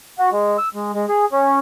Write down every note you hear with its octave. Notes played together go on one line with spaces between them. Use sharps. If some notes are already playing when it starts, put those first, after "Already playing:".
F#4
G#3
E6
G#3
G#3
G#4
C#4